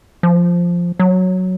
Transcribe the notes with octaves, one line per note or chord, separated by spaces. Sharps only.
F3
F#3